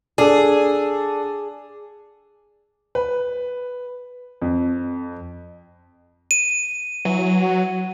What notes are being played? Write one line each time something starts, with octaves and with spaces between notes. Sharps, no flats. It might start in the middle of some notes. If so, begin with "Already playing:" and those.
D4 G#4 A4
B4
F2
D#7
E3 F#3
F#4